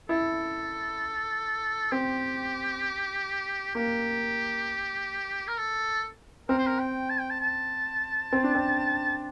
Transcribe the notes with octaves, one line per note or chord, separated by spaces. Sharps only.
E4 A4
C4 G4
A#3 G4
A#4
A4
C4 A#4
C5
A#4
G5
A5
G5
A5
A5
C4
D4
C4